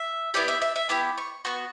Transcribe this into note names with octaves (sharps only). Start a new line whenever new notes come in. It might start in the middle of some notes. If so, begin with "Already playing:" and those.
Already playing: E5
B3 E4 G4 D5
E5
E5
E5
B3 E4 G4 D6
C#6
B3 F#4 C#6